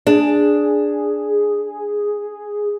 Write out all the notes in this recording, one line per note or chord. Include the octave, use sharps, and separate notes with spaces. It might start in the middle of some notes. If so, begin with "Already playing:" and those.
D4 G#4